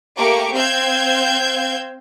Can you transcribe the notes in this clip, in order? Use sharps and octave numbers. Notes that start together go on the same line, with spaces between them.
A3 A#3 G4 C#6 D6
C4 F5 E6 G6 G#6